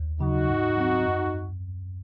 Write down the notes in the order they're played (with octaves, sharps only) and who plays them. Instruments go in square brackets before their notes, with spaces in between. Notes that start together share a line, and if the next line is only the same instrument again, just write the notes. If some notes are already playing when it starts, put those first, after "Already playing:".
Already playing: [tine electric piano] D#2
[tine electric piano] C#3 F#3 [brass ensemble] D#4 F#4
[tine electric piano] G#2
F#3 C4
F#2